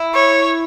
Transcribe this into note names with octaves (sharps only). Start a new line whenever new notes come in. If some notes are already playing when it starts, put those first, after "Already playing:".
Already playing: E4
C#5